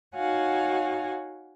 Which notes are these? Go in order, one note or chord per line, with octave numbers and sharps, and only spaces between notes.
D#4 F#4 C#5 F5 F#5 G#5